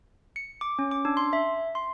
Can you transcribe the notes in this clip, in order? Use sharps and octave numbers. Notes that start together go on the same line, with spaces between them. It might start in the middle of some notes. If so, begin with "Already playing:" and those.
C#7
D6
C#4
D6
D4
C6
E5
C6